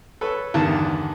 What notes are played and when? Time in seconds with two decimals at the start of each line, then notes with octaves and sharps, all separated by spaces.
0.21 A4 B4 C#5
0.54 E2 G2 D3 D#3 A5